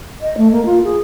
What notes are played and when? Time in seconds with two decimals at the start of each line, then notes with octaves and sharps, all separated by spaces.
0.21 D#5
0.37 A3
0.51 A#3
0.65 F4
0.83 G#4